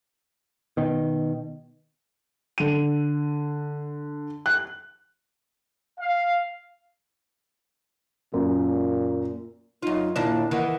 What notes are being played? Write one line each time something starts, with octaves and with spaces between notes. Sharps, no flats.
B2 D#3
D3 D#7
F#6
F5
F#2 A#2
F#2 D#4 F4
D#2 A#2 D4 E4
D#3 E3 F#5